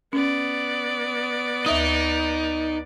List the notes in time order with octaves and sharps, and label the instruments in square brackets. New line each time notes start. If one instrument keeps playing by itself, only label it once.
[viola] B3 D5 [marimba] C#4
[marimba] D2 E5 D#6 [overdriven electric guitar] D#4